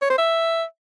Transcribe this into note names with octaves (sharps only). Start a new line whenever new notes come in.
C#5
C5
E5